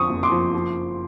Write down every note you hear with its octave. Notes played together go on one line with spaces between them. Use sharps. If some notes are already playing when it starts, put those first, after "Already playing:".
Already playing: F2 D3 C#6 D#6
F#1
C6 D6
F3
F3